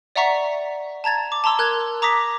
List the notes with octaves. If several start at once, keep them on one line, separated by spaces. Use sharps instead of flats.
D5 E5 F#5 A#5 C#6 B6
A5 A#5 G#6 A6
D6
A5 A#5 C6 E6
A#4 F#6 G#6
A#5 D6 D#6 A#6 B6